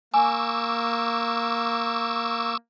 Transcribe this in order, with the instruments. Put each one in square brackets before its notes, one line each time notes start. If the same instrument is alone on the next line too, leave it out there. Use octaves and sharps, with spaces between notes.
[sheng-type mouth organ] A#3 [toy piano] G#5 [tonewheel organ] C#6 D6 E6